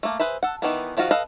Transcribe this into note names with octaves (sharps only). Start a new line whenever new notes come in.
A3 A#3
G#4 B4 C5 E5
A4 F#5
D#3 E3 B3
D#3 F3 F4 F#4 F5
A4 B4 D#5 F5